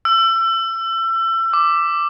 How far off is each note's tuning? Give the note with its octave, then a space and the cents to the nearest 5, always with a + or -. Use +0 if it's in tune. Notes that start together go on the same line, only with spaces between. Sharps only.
E6 +30
D6 +5